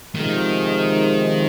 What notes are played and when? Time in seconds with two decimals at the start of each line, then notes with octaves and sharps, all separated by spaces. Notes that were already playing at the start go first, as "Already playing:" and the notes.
0.15 C3 D#3 F3 G#3 D#4